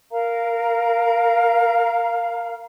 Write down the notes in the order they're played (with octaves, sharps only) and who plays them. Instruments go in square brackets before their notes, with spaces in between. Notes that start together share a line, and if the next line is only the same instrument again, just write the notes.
[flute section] A#4 F5 A#5